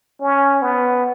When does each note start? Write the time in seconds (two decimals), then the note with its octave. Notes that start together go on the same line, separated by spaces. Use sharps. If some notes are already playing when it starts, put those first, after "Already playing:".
0.21 C#4
0.62 B3